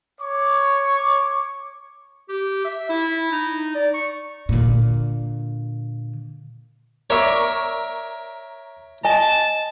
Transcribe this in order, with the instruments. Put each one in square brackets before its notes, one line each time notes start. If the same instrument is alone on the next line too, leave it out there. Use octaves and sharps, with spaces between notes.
[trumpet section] C#5 C#6 D6
[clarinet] G4
E5
E4
D#4
D5
C#6
[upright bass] A#2 D3
[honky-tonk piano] A#4 C#6 [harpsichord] C#5 E5 [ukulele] D5
[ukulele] D#5 G#5 [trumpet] A5